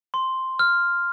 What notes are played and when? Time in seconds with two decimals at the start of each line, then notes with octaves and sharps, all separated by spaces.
0.14 C6
0.59 F6